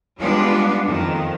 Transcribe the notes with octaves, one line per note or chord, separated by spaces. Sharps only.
G3 G#3 B3 D4 F4
F2 D#3